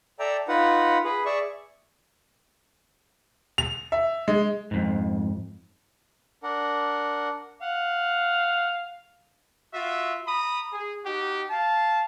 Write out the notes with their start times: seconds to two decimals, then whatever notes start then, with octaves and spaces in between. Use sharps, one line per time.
0.19 A4 D5 E5 G5 A#5
0.48 D#4 F4 B4 F#5
1.04 G#4 B4
1.25 G#4 D5 E5 C#6
3.58 F7
3.92 E5
4.28 G#3
4.71 F2 G#2
6.43 D4 A#4 F#5
7.61 F5 F#5
9.74 F4 F#4 E5
10.27 A#5 B5 D#6
10.73 G#4
11.05 D#4 F#4 G4
11.50 F5 A5